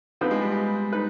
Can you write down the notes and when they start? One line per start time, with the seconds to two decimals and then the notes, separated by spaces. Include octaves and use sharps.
0.21 F3 B3 C4 D#4 B4
0.31 G#3
0.41 G3
0.52 G#3
0.93 D#4 B4